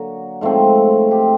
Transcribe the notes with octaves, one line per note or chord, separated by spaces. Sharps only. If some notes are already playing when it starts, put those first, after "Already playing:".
Already playing: D3 F#3 A#3 F#4
G#2 F3 A3 C4
G4